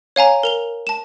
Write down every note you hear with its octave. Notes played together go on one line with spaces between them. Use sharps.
C#5 F5 G#5 A#5
A#4 F7 G7
A5 E7